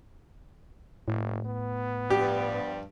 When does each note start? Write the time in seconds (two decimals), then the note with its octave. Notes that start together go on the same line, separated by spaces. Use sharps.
1.08 F#1 A2
1.47 B3
2.10 G2 F3 G3 G4